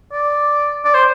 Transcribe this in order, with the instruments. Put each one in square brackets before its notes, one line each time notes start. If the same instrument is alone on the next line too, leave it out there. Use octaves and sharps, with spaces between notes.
[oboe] D5
D5
C5